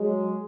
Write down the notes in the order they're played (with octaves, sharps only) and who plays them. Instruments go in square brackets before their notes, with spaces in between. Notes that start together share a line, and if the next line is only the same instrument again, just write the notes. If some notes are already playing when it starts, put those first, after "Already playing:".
Already playing: [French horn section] F#3 G#3